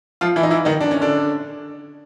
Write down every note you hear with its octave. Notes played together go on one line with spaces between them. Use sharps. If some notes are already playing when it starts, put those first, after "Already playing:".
F3 F4
E3 E4
D#4
E3 E4
D#3 D#4
D4
C#4
D3 D4